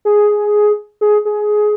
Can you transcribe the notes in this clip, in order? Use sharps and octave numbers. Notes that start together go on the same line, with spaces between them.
G#4
G#4
G#4